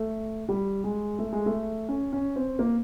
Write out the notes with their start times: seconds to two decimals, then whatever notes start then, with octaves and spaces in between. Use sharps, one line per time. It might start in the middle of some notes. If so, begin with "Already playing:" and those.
Already playing: A3
0.49 G3
0.84 G#3
1.19 A3
1.33 G#3
1.46 A3
1.89 C#4
2.13 C#4
2.36 C4
2.59 A#3